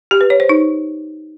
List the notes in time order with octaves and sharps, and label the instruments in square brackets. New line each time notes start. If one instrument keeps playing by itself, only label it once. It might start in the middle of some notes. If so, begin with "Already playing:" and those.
[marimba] G4
B4
C#5
C5
D#4